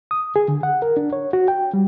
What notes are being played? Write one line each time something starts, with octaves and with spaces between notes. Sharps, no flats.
D#6
G#4
D3
F#5
A#4
D4
C#5
F#4
G5
G3